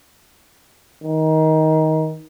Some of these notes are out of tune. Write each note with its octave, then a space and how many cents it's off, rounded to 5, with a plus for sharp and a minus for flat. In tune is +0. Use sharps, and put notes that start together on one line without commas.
D#3 +20